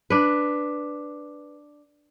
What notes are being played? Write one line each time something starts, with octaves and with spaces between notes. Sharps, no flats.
D4 B4